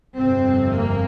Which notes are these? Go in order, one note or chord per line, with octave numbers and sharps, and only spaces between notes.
G1 F2 C3 C4
A#3